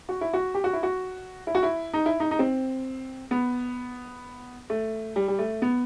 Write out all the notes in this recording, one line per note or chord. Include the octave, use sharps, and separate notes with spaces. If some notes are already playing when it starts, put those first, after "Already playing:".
F#4
E4
F#4
G4
F#4
E4
F#4
E4
F#4
E4
D#4
E4
D#4
D#4
C4
B3
A3
G3
G3
A3
B3